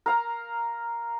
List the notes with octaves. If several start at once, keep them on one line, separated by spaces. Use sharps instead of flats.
A#4 F5 A#5